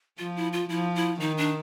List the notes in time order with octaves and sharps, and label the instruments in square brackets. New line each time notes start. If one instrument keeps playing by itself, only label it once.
[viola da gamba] F3 [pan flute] F4
[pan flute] E4
F4
[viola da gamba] F3 [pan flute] E4
[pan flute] E4
[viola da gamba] D#3 [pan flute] D#4
[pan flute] D4